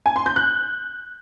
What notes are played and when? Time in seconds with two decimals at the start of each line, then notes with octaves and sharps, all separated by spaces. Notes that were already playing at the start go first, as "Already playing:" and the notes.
0.06 G#5
0.16 C6
0.26 G6
0.36 F#6